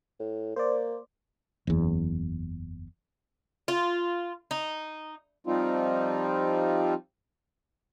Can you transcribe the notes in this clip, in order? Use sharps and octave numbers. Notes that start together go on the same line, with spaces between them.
A2
A#3 C5 D5
F#1 E2
F4
D#4
F3 G3 C4 D#4 F4